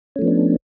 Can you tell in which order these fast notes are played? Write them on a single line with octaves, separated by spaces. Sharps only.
C#4 A3 F3 B3 D4